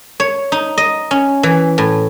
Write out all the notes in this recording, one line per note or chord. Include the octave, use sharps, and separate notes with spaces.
C#5
D#4
D#5
C#4
E3
A2